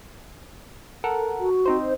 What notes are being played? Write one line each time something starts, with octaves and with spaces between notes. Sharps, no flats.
A4 A#4 F#5
F#4
C4 D#4 C5